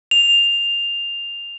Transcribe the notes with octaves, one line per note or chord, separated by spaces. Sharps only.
F7